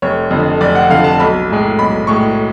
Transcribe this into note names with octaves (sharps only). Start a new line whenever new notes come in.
F1 C#5
F2 D3
F1 D5
F#5
F2 D3 F5
A5
B1 B5
A2 G#3
B1 B5
A2 G#3 C#6